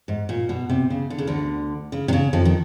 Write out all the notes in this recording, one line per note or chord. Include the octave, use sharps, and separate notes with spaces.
G#2
A#2
B2
C3
C#3
D3
C#3
D2 D3
C#3
C3
C#3
F2 F3
D#3